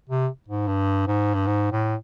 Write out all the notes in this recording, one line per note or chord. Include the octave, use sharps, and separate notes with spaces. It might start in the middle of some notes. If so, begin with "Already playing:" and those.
C3
G#2
G2
G#2
G2
G#2
A2